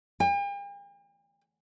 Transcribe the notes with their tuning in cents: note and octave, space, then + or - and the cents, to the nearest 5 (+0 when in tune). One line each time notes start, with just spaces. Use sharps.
G5 +45